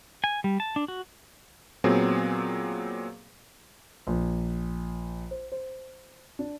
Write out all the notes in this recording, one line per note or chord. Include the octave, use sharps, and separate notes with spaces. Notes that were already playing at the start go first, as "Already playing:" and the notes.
G#5
G3
A5
D4
F#4
A#2 F#3 B3 C4 G#4
A#1
C5
C5
D4